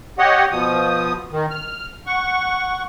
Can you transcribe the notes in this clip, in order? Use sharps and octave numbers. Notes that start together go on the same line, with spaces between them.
G4 C#5 D#5 F#5
B2 F3 D#6
D#3
F6
F#5 C#6